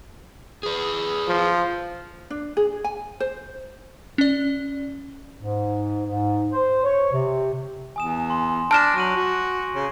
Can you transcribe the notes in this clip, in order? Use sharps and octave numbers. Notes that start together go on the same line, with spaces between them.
G#4 B4
F3
D4
G#4
G#5
C5
C#4 D5
G#2
G#2
C5
C#5
C3
E2 G#5 D#6 E7
C6
D4 A5 F6 G6 A#6 D7 E7
F#3 C#6 D#7 F#7
F#4
C#3